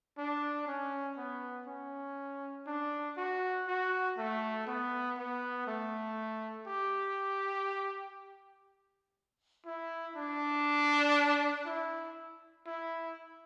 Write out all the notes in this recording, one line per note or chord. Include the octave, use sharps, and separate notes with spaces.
D4
C#4
B3
C#4
D4
F#4
F#4
A3
B3
B3
A3
G4
E4
D4
E4
E4